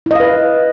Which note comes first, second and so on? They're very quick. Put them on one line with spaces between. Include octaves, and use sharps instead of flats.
E4 D#5 F5 B4